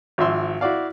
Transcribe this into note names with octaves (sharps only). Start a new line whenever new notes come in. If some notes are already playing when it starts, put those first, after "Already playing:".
G#1 F3 E5 C6
E4 F#4 D5 F5